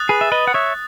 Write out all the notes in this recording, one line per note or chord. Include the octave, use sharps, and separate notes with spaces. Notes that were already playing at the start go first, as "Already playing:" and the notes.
Already playing: D#6 F#6 A6
G#4 B4
E5
B4 D#5
F#5
C#5 E5